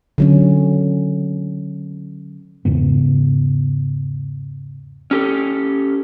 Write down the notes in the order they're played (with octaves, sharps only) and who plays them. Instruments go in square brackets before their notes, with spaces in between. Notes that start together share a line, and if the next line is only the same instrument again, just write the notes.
[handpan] D3 F#3 C#4
[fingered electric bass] E2 G#2 C#3 B3
[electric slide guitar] C#4 G4 A4